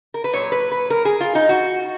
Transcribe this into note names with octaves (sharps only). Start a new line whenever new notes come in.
A#4
B4
A#2 F#3 C#5
B4
B4
A#4
G#4
F4
D#4
F#4